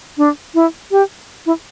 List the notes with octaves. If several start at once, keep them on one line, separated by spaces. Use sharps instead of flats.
D4
E4
G4
E4